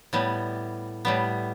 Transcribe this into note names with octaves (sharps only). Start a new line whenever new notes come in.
A2 G3 B3
A2 G3 B3